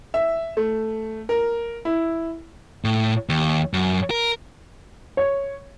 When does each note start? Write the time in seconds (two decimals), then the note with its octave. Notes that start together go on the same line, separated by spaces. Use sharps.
0.14 E5
0.57 A3
1.29 A#4
1.85 E4
2.84 A2
3.29 D#2
3.73 F#2
4.10 A#4
5.17 C#5